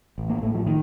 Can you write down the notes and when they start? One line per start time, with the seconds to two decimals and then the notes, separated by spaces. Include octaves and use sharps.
0.18 A1
0.30 A#3
0.42 A2 A3
0.54 F3
0.66 D#3